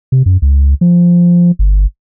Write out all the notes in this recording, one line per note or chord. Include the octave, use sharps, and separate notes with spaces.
C3
F#2
C#2
F3
G1